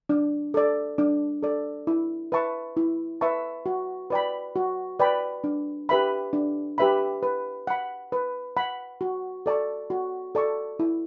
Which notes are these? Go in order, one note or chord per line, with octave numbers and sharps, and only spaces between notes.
D4
A4 D5
D4
A4 D5
E4
B4 E5 A5 C#6
E4
B4 E5 A5 C#6
F#4
B4 D5 G5 B5
F#4
B4 D5 G5 B5
D4
G4 B4 E5 B5
D4
G4 B4 E5 B5
B4
F#5 B5
B4
F#5 B5
F#4
A4 D5 A5 C#6
F#4
A4 D5 A5 C#6
E4